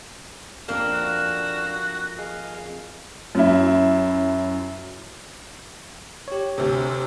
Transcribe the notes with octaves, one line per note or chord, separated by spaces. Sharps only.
F2 A#3 D4 A#4 F5 E6
F#4
G#4 D#5 F5
F#2 E4
G4 C#5
D2 C3